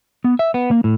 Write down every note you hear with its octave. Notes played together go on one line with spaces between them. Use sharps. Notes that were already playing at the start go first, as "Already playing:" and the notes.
B3
E5
B3
A#3
A2